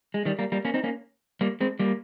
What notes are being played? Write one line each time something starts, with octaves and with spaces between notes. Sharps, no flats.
G#3
D#3 G3
G3 A#3
G3 A#3
A#3 C#4
C4 D#4
A#3 C#4
G3 A#3
G#3 C4
G3 A#3